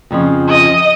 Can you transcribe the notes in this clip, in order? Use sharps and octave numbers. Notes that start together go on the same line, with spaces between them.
F2 C#3 F3
D#5